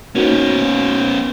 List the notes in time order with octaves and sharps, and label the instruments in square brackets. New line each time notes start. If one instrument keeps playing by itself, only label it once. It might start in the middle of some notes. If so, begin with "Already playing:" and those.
[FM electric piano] A#3 D#4 F#4 [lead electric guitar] B3 C#4